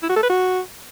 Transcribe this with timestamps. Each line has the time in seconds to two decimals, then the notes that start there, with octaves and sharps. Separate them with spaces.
0.03 E4
0.09 F#4
0.16 A4
0.23 B4
0.30 F#4